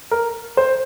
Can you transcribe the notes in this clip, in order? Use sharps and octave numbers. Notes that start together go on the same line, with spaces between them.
A#4
C5